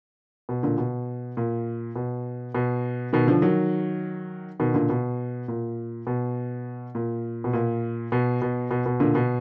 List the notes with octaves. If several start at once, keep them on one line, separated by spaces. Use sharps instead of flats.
B2
A#2 D3
B2
A#2
B2
B2
B2 D#3
D3 F3
D#3 F#3
B2 D#3
A#2 D3
B2
A#2
B2
A#2
B2
A#2
B2
B2
B2
B2
A#2 D3
B2